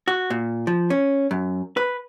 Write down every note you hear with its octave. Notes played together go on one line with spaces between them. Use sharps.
F#4
A#2
F3
C#4
F#2
B4